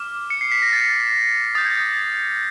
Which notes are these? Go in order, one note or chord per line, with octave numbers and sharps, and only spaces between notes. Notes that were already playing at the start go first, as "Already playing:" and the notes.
Already playing: D6 F6
C#7
C7
B6
A#6
A6
D#6 G6 A6
G#6
A6